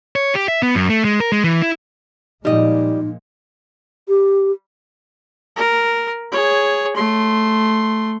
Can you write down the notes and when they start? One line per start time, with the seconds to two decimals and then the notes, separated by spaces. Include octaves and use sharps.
0.16 C#5
0.35 G4
0.48 E5
0.63 B3
0.75 F#2
0.90 A3
1.05 G#3
1.20 A#4
1.32 G#3
1.44 E3
1.62 E4
2.45 A#2 F3 G3 G#3 D#4 D#5
4.08 G4
5.56 A#4
6.32 G#4 C#5
6.96 A3 C6